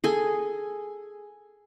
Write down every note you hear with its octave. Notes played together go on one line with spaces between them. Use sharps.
G#4 A4 G#5